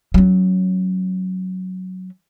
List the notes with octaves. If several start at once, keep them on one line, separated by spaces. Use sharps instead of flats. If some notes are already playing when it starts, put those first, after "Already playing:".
F#3 C#4